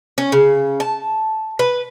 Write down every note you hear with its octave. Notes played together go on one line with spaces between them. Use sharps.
C#4
C#3
A5
B4